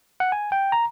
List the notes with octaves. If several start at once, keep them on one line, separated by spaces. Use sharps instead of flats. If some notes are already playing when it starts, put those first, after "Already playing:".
F#5
G#5
G5
A#5